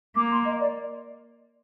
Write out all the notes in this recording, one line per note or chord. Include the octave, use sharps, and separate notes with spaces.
A#3 D6
C6
D#5
D5